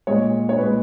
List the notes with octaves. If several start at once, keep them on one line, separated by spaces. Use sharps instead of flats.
A#2 G#3 C#5
C#5
A#2 B4
G#3